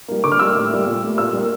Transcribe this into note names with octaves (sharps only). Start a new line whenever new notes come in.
G3 A#3
D3 D6
F6
G3 A#3 E6
A2
G3 A#3
A#2
A3
A#2 E6
G3 A#3